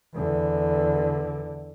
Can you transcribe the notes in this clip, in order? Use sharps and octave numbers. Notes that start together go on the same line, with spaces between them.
E2 D3